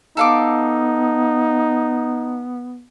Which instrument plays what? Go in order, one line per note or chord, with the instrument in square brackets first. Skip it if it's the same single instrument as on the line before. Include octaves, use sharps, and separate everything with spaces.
[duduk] B3 [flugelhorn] D#4 [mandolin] A4 F5 D6